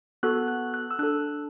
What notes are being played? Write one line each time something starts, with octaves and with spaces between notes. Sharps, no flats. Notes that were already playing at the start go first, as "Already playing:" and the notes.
B3 F#4 A4 F#6
F#6
F#6
E6
D4 A4 F#6